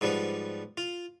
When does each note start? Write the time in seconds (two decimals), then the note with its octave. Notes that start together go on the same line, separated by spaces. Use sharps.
0.01 G#2 F3 G3 B3
0.77 F4